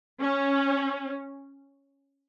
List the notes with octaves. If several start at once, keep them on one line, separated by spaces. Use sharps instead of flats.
C#4